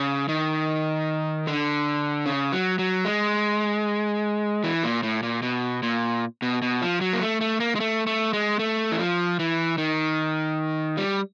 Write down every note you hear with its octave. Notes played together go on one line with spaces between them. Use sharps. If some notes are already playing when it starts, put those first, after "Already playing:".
Already playing: C#3
D#3
D3
C#3
F#3
F#3
G#3
E3
A#2
A2
A#2
B2
A#2
B2
B2
F3
F#3
A#3
A3
A3
A#3
G#3
A3
A3
G#3
A3
E3
F3
E3
D#3
G3